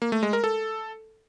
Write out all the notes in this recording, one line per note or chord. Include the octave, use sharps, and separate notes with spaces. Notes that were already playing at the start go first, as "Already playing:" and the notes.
A#3
A3
G#3
A#4
A4